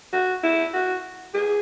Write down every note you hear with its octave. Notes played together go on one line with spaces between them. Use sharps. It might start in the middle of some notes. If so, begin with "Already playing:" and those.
F#4
E4
F#4
G#4